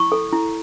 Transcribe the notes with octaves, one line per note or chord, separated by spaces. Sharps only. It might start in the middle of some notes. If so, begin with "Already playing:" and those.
Already playing: E4 C#6
A4
E4